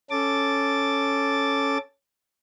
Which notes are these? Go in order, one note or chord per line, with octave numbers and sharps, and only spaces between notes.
C#4 A4 D6 A6